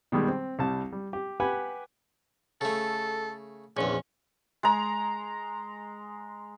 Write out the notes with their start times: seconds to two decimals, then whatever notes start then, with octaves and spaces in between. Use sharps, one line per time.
0.12 B2 D#3 G3 G#3
0.28 C4
0.59 C2 G3 A5
0.92 G3
1.13 G4
1.40 G4 B4 F#5 G#5 B5
2.61 C#3 A3 A4
3.77 A#1 E2 C#4
4.63 G#3 A#5